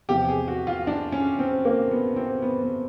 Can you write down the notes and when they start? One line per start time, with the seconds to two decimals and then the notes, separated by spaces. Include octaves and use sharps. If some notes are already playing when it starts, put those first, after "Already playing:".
0.09 E2 C3 F3 G4
0.28 G#4
0.48 F#4
0.67 F4
0.87 D4
1.12 C#4
1.39 C4
1.65 A#3
1.91 B3
2.16 C4
2.42 B3
2.62 B3